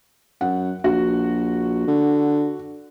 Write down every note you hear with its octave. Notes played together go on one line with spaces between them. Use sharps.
F#2 F#5
A#1 F#4
D3